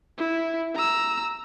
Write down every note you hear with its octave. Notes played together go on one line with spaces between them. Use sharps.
E4
A#5 E6